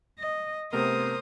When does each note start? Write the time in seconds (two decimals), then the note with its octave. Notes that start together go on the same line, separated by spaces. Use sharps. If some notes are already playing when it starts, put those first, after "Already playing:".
0.19 D#5
0.73 C3 A3 B3 A#4 C5 D#6